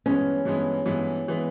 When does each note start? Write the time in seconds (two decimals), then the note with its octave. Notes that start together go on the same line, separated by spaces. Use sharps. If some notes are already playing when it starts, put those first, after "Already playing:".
0.06 G2 E3 G#3 B3 C#4
0.45 G2 E3 G#3 B3
0.86 G2 E3 G#3 B3
1.28 E3 G#3 B3